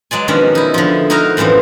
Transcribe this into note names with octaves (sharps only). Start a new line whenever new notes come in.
F#3 G#3 D5 G#5
B2 D#3 F3 C#4 D4
D#4 E4
D3 F3
D#4 E4 F#4 A#4 D#5 F5
F#2 A2 E3 F3 C4